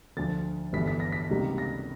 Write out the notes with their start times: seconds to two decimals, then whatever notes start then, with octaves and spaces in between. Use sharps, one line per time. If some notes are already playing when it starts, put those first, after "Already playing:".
0.17 D2 D3 F3 A6
0.73 G1 G2 E3 B6
0.88 B6
1.00 A#6
1.12 B6
1.29 C#2 C3 D#3 G3 A#3
1.58 A#6